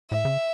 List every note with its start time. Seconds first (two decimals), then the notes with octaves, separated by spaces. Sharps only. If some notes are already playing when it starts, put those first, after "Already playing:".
0.11 A2 E5
0.25 C#3